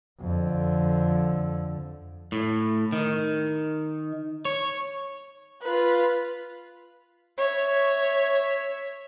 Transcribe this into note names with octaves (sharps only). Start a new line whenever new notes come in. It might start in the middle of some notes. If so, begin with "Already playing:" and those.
F2 D3
A2
D#3
C#5
F4 B4
C#5 E5